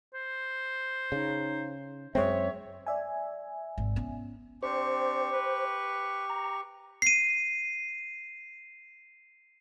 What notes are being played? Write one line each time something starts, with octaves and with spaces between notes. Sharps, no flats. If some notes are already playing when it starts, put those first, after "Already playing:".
C5
C#3 D#4
F#2 G#3 C4 C#5 E5
D5 E5 G#5
G#1
B3 C#4
C4 D4 G4 C5 C#6
B4
A#5
C7 D#7